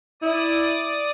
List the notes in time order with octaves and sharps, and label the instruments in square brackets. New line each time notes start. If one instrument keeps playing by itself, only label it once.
[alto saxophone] E4 [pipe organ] D5 D#6